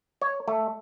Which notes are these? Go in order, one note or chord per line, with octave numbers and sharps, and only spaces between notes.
C#5
A3